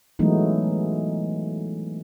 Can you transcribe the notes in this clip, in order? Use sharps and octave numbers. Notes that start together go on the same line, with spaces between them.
E3 F#3 G#3 A3 B3 D#4